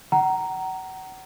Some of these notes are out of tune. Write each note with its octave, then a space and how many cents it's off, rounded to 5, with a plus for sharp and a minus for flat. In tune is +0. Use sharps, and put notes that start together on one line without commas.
F#5 +35 A#5 +0